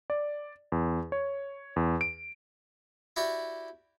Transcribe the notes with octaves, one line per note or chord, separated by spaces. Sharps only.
D5
E2
C#5
E2
D7
E4 F#4 G4 D5 E5